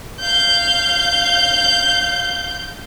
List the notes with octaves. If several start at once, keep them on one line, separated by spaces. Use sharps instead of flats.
F5 G6